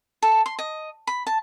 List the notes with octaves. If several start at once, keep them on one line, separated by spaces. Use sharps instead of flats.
A4
C6
D#5
B5
A5